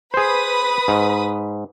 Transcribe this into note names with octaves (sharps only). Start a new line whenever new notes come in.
G#4 B4 C5 B5 D#6
G#2